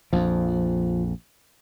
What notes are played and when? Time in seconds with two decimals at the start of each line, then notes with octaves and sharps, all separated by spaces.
0.13 A#1 F2 F3